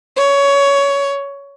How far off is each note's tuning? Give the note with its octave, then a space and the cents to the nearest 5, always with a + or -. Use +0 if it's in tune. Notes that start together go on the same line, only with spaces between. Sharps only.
C#5 +15